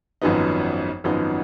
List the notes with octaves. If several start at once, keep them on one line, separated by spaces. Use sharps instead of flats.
G#1 F#2 F3 B3 D#4
G#1 F#2 F3 B3 D#4